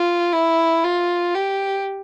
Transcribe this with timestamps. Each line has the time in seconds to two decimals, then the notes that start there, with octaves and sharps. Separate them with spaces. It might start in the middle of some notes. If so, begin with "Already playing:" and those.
Already playing: F4
0.33 E4
0.84 F4
1.34 G4